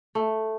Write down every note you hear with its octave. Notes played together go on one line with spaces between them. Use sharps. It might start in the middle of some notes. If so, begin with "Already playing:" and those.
A3